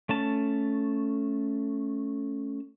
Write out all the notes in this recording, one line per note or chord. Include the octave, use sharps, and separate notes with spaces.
A3 C#4 A5